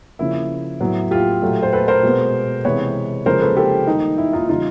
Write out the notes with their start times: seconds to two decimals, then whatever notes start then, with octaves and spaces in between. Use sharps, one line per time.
0.19 C#3 F3 A#3 E4
0.80 A2 F#3 B3
1.11 F4 G4
1.42 A#2 F#3 A3
1.63 C5
1.73 A4 B4
1.88 A#4 C5
2.03 B2 G#3 B3
2.64 C3 E3 G#3 B3 B4 C#5
3.26 C#3 F3 G#3 A#4 C5
3.41 A4 B4
3.57 G4 A4
3.87 D#3 G3 A#3 D#4
4.18 E4
4.33 D#4 F4
4.49 C#3 E3 G3 D#4 F4